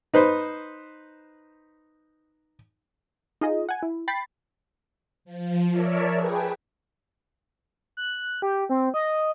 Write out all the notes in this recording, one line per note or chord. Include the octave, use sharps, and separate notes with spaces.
D#4 B4 C5
D#4 F4 G#4 D#5
F#5 G#5
E4
G5 B5 A6 C7
F3
A#4 C#5 D5 E5 A5
G#4 B4 G5
F#6
G4
C4
D#5